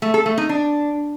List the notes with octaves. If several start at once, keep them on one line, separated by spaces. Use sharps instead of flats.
A3
A4
A3
D#4
D4